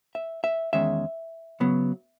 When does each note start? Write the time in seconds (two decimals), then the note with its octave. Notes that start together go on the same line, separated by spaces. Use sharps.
0.15 E5
0.44 E5
0.73 E2 D#3 G#3 C#4 E5
1.60 C#3 F#3 B3